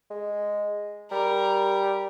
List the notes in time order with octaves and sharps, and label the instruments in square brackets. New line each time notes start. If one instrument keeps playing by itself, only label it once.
[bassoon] G#3
[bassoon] G3 [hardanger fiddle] A#4